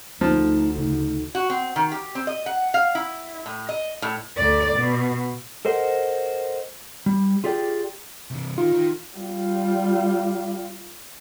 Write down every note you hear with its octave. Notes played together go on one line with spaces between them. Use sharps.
D2 F3 D#4
C#3 C#4 D#4
F#4
C4
D#3
G4
C4
D#5
F#5
F5
E4
A2
D#5
A2
D2 D5
B2
A4 A#4 C5 D#5 F#5
G3
F4 G4 G#4 D5 G5
C3 E3
D#3 D#4 F4
D#3
G3 F4